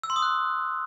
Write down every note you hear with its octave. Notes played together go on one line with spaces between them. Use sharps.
E6
C6
D#6
F#6